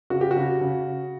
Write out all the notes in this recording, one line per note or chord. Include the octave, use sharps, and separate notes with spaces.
C#3 F#4
G4
F#4
C#3
C#3